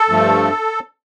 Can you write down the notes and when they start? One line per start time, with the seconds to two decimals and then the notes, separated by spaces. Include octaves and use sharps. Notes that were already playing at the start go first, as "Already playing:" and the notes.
Already playing: A4
0.09 G2 F3 A3